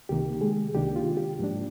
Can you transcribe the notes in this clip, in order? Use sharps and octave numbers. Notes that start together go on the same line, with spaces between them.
C2 C3 D#3 A#3 G4
G#3 G#4
C2 C3 D#3 A#3 D4 G4
F4
G4
G#2 F3 A#3 D4